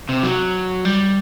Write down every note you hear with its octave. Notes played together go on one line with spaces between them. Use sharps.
C3
F#3
G3